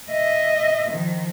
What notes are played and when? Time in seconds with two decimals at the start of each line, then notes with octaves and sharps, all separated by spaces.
0.10 D#5 E5
0.90 D#3 F3